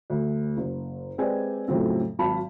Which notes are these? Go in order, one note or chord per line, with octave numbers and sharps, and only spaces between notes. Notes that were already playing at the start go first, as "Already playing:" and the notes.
D2
F#1
G#3 C4 G4 B4 D5 G#5
F2 A2 C#3 F#3 C4
G#1 F#3 F4 A5 B5